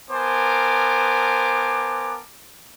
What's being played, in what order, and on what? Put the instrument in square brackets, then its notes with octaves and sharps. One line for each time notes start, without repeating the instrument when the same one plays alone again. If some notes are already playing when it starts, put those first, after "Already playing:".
[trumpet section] B3 A#4 C5 G#5 A5 D6